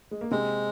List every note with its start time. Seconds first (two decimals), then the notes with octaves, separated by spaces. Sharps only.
0.11 G#3
0.21 A#3
0.31 C3 G#3 C4